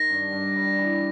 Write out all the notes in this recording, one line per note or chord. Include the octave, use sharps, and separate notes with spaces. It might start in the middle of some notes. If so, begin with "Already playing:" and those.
Already playing: D#3 A#6
G2
G2
G3
E3